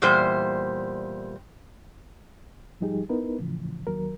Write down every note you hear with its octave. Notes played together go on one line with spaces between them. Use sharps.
E2 A#2 G3 C5
G#2 F3 G3 D#4 G4 G#4
B3 D#4 E4 A#4 B4
A2 C#3 E3 F3
D#2 F#3 A#4